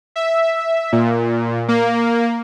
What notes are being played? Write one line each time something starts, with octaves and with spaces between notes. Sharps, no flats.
E5
A#2
A#3